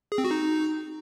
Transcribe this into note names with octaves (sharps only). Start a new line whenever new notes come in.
G#4
C4
F#4
D#4